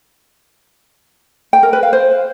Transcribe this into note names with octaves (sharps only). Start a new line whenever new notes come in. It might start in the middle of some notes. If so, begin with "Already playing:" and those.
G5
A#4
B4
F5
C5